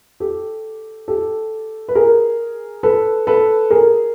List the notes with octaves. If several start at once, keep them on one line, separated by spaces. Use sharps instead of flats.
G4 A4
G4 A4
B4
G#4 A#4
A4 B4
A4 B4
G#4 A#4